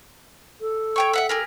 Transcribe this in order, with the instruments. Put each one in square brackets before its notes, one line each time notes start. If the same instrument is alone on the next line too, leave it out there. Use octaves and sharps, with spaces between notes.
[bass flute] A4
[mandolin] C#5 G5 C#6
E5 F#5 E6
G4 G#4 A#4